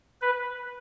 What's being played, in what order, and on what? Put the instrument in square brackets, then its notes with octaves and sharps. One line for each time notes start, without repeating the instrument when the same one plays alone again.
[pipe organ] B4